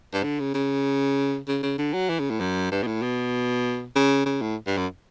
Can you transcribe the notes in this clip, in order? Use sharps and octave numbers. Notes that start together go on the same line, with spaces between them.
G2
D3
C#3
C#3
C#3
C#3
D3
F#3
E3
C#3
A2
F#2
G2
B2
A2
B2
C#3
C#3
A2
G2
F#2